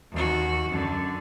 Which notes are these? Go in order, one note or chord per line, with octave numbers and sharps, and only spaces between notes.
D#2 F#4
F#2 D3